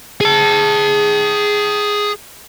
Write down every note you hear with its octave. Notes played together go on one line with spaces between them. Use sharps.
G#4 A5